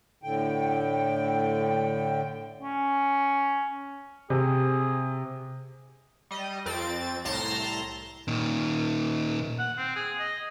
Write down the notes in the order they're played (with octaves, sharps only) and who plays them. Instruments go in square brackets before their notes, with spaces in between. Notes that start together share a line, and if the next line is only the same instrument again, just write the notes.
[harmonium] A2 D3 G5
[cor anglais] C#4
[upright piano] C3 [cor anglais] G#4
[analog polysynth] G3 D#5
F2 C4 A6 D7
C2 A2 A5 A#5 C6 A#6
[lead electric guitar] A#2 D#3
[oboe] F#5
C4
G#4
D#5